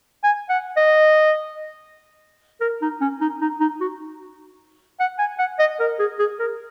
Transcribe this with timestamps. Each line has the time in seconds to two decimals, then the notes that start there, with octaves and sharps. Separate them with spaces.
0.23 G#5
0.49 F#5
0.77 D#5
2.61 A#4
2.82 D#4
3.01 C#4
3.21 D#4
3.41 D#4
3.60 D#4
3.81 F#4
5.00 F#5
5.19 G#5
5.39 F#5
5.59 D#5
5.80 A#4
5.99 G#4
6.19 G#4
6.39 A#4